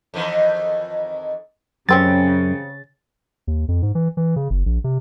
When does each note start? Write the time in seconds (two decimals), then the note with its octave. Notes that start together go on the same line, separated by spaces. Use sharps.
0.14 F2 D#3 E3
1.89 F#2 C#3 G3 C4 C#4 A6
3.47 D#2
3.68 F2
3.82 G#2
3.95 E3
4.17 E3
4.36 C#3
4.50 F#1
4.66 A#1
4.84 C3